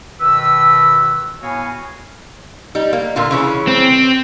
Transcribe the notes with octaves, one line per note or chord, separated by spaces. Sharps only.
B2 D#3 B4 E6
A2 B3 F#4 C#5 F5 G#5
G3 D#4
A#3
A#2 D3 F4
C#3 E3 C#4
C4